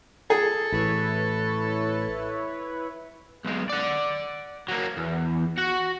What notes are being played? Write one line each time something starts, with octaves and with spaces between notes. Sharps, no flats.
G#4 A4
A1 E4 B4 C#5
B1 G#3
D5 F#5
F#3 A#3
E2
F#4 F#5